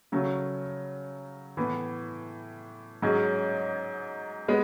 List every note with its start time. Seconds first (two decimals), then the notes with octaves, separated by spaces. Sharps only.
0.12 C#3 F#3 A3
1.57 A2 E3 B3
3.02 G#2 F#3 C#4 G#4
4.48 G#3 B3